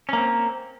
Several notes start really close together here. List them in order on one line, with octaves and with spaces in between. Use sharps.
C#4 A#3 C4